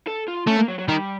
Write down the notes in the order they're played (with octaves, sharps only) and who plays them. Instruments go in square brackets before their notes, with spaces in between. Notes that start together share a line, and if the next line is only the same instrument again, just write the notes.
[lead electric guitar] A4
F4
[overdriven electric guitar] A3 [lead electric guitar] C#4
[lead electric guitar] A#3
F#3
F#3
[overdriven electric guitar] D#3 [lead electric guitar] G3